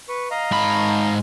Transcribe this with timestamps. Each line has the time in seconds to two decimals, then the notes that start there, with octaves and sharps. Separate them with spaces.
0.09 B4 C#6
0.31 D#5 F5 A#5
0.51 G#2 B5